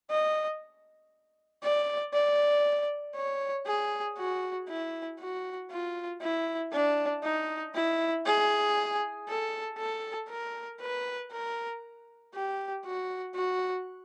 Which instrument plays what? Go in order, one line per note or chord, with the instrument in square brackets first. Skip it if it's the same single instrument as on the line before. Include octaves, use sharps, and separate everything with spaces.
[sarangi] D#5
D5
D5
C#5
G#4
F#4
E4
F#4
F4
E4
D4
D#4
E4
G#4
A4
A4
A#4
B4
A#4
G4
F#4
F#4